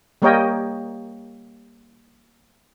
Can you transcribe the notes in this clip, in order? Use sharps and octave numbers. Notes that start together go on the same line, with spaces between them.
G3 A#3 A#4 C#5 D#5 G5